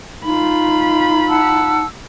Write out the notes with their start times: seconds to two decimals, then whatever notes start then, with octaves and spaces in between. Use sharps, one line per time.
0.25 D#4 F4 B5
1.29 F#5 A5 E6